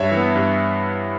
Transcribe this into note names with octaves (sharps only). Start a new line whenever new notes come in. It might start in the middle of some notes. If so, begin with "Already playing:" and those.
Already playing: G2 C#5 E5
E3
B3
G2